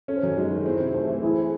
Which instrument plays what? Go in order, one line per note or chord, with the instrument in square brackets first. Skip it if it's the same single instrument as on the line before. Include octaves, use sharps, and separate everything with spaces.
[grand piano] C#4 [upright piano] A4
[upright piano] C5
[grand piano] F#2 [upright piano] F#4 A4
[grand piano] G#3 [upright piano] D#4 F#4
[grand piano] D#3
[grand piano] C4 [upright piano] E4 G#4
[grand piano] C3
[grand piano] A3 [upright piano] G#4 C5
[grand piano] E3
[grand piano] C4 [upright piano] E4 G#4